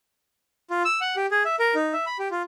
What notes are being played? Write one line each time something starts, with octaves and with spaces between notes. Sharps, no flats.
F4
E6
F#5
G4
G#4
E5
A#4
D#4
E5
B5
G4
F4